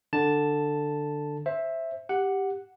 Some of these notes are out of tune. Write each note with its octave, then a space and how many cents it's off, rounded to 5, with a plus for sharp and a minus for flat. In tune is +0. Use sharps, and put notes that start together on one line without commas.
D3 +10 A5 +0
C5 +20 E5 +0
G4 +0 F#5 +0